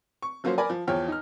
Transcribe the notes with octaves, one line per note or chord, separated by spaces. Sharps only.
C#6
F3 F#3 A#3 C#4 C5
A#4 D5 G#5 B5
F3
E2 F3 C#5 G5 F6
D#4 F6